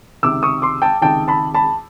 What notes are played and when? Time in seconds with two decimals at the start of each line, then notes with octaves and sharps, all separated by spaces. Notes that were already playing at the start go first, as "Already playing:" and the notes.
0.23 C#2 C3 D#3 D6 E6
0.43 C#6 D#6
0.62 C6 D6
0.82 G5 A5
1.01 C#2 C3 D#3 G5 A5
1.28 A5 B5
1.54 A5 B5